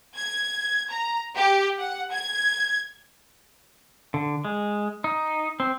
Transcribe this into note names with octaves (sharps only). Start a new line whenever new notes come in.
G#6
A#5
G4
F#5
G#6
D3
G#3
D#4
C4